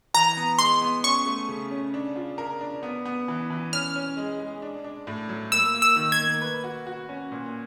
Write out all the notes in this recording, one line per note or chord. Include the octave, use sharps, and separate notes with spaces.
E3 A#5
B3
G#3 C6
B3
C#4 C#6
A3
C#3
C#4
D4
F4
A#4
D4
B3
B3
E3
E3
C#4 F6
C#4
G#3
G#3
D4
D4
A2
F#3
A#3 E6
A#3
E6
D#3
G#6
A#3
B4
F#4
F#4
C#4
A#2